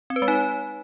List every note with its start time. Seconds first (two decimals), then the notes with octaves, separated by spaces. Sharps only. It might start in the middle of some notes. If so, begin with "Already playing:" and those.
0.10 C4
0.16 B4
0.22 G#3
0.28 D#4